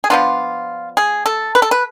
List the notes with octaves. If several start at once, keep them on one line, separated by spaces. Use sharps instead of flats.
G#4
F3 B3 D4 F4
G#4
A4
B4
A4
B4